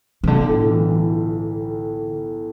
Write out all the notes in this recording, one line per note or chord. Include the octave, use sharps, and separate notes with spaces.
C3
B1 D3
A2
E3
E3